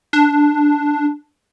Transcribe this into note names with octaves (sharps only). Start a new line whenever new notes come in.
D4